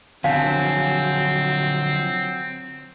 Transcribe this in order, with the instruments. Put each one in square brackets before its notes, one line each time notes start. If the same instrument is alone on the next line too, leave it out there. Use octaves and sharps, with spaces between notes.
[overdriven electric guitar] D3 F3 [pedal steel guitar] F#3 G#5 A5 [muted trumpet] C4 [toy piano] F5